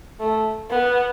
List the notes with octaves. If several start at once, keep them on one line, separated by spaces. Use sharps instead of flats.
A3
B3